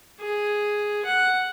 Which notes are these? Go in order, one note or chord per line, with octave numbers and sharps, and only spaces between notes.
G#4
F#5